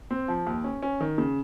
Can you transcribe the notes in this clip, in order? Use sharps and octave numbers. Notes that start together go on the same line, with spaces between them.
C4
F3
D#2
C#4
C#4
D#3
C#3